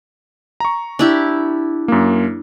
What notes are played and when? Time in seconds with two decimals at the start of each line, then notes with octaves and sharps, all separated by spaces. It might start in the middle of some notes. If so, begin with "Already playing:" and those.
0.60 A#5 C#6
0.99 D4 E4 G4
1.88 F#2 A#3